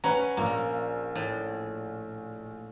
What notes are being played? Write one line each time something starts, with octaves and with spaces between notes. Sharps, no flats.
C#4 B4 F#5 A#5
A#1 A#3
A2